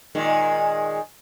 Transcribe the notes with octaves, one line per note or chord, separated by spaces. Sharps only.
A#2 D#3 G#3